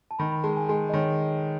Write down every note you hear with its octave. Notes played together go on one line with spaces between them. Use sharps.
A5
D#3 B5
B5
G#3 A5
G#5
G#3 G#5
D#5
D#3 C#5